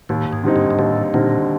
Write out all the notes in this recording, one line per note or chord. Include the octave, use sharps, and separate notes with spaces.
D#2 A2
G#2
D3 G3 C4 D#4
G#2
G#2
D#2 A2
A#2 D3 G3 C4 D#4